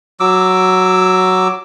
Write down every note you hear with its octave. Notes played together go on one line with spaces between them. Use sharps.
F#3 D6 E6